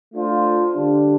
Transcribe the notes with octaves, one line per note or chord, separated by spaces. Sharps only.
A3 D4 F4 C5
D3 G3 D4